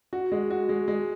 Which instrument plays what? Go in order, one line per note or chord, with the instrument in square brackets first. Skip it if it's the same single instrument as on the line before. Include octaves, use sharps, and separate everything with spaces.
[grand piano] F#4
G#3
F#4
G#3
G#3